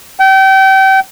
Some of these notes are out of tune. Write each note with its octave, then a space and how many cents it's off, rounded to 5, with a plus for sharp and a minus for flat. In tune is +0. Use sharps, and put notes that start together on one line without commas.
G5 -30